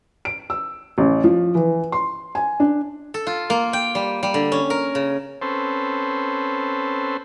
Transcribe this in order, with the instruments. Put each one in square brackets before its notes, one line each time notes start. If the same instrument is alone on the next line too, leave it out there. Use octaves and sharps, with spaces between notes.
[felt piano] D7
E6
A1
F3
E3
C6
G#5
D4
[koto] A4
F4
A#3
G5
G3
G3
D3
C#4
A#4
C#3
[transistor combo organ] C4 C#4 A4 B4 C5